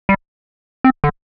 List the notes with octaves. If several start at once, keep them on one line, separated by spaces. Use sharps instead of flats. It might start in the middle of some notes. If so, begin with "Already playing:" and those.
G3
C4
D3